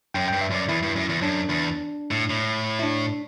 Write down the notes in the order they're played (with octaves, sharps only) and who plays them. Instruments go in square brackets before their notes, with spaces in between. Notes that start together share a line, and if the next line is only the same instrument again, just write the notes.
[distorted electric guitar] F#2 [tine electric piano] G5
[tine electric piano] G5
[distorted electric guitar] G2
[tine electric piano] E5
[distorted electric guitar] F#2 [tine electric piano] D5
[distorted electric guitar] E2 [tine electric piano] E4
[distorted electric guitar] G2
F#2
E2
[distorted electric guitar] F#2 [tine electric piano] D4
[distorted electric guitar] E2
A2
A2
[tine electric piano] E4
D4